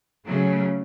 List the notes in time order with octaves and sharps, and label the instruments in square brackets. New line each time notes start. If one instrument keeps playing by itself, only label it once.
[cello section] C#3 F#3 A3